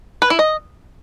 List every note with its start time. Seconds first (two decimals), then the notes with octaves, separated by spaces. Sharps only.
0.22 B4
0.30 E4
0.39 D#5